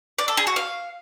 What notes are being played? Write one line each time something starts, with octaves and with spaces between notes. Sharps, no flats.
D5
A4
G#4
F#4
F5